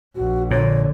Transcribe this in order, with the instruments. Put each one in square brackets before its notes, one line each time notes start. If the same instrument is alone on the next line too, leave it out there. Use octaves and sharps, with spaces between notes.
[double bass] A#1 [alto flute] F#4
[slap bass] A#2 [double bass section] D3 [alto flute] C#5